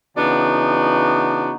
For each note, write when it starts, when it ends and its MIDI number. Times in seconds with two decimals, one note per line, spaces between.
0.17 1.54 49
0.17 1.54 52
0.17 1.54 59
0.17 1.54 62
0.17 1.54 63
0.17 1.54 66